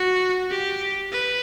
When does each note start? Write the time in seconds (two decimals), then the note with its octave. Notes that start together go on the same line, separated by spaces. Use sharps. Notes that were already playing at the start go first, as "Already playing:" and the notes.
Already playing: F#4
0.50 G4
1.12 B4